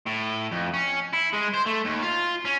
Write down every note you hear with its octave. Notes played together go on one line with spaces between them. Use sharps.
A2
F2
C#4
E4
G#3
C5
A3
D#2
F4
C#4